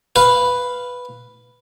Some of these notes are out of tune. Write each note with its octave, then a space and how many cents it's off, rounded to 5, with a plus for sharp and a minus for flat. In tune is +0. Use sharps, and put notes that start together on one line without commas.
B4 +0 F5 +0